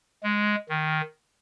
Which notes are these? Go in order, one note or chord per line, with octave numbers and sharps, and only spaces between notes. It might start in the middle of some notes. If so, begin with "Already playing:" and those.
G#3
D#3